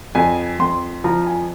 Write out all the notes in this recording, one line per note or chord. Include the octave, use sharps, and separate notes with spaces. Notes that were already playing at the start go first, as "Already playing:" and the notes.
F2 G#5
F2 C6
F3 A#5
G#5